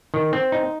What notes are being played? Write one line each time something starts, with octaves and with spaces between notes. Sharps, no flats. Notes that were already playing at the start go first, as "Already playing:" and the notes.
D#3
C4
D#4